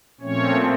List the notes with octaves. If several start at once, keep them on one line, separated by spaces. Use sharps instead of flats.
A#2 F3 A3 C4 C#4 C#5